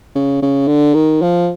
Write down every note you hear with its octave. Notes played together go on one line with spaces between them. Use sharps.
C#3
C#3
D3
D#3
F3